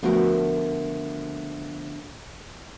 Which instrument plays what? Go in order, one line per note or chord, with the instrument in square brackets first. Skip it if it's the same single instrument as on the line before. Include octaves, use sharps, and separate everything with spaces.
[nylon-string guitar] D3 F3 A3 B3 F#4 A#4